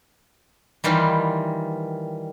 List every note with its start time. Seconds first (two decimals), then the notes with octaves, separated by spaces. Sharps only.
0.84 D#3 E3 G3 F4